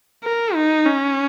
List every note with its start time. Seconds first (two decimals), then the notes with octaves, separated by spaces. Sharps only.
0.24 A#4
0.55 D#4
0.86 C#4